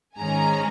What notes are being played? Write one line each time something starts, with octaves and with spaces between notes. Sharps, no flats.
G#2 D#3 G#3 C#4 G#5 A#5